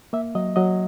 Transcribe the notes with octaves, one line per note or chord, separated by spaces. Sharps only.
A#3 E5
F#3 D#5
F#3 D#5